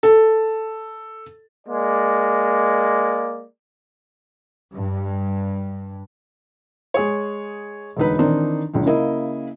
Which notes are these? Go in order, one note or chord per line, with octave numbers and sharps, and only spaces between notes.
A4
G#3 A#3 D5
G2
G#3 G#4 C#5
E1 D2 D#4 B4
D#3 E3 C4 D4 D#4
F#1 C#2 D3
C#3 A#3 E4 D#5